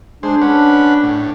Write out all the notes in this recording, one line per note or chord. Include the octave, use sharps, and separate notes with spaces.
G#3 D4 C5
C#4 B4 F#5
A2